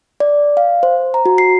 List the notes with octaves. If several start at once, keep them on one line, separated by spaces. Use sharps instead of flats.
D5
F5
C5
A#5
F#4
C7